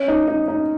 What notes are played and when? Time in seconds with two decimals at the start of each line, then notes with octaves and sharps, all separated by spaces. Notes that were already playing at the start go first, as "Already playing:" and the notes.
Already playing: C#4
0.08 D#4
0.28 D#4
0.48 D#4